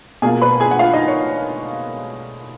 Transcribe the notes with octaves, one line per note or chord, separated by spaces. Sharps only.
B2 A#3 F4 G#4 G#5
B4 B5
G#4 G#5
F#5
F4 F5
D#4 D#5
C#5